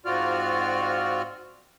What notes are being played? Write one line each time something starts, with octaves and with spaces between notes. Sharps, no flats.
G#2 C4 F4 F#4 D5 F6